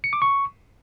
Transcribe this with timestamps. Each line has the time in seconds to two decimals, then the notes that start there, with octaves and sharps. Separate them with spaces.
0.04 C#7
0.13 D6
0.22 C#6